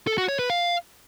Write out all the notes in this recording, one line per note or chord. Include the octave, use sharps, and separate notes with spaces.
A4
F#4
C#5
B4
F5